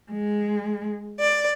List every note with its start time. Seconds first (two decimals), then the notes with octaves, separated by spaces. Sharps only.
0.12 G#3
1.21 D5